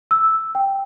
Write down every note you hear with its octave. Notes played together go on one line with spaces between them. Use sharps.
E6
G5